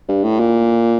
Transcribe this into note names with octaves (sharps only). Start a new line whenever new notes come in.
G2
A2
A#2